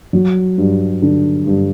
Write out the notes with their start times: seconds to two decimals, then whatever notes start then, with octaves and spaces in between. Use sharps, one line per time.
0.13 F#3
0.58 G2
1.02 D3
1.47 G2